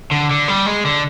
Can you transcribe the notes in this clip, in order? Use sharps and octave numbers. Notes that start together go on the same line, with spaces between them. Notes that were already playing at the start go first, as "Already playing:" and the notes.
D3
D3
G3
G#3
D3